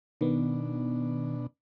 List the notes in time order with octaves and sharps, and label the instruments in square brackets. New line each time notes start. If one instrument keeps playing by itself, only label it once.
[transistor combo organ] B2 D4 [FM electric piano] D#3 B3